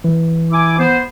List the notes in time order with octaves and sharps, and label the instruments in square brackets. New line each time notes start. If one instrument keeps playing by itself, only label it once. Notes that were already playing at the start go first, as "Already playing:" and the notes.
[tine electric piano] E3
[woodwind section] E4 G#5 D6
B3 C5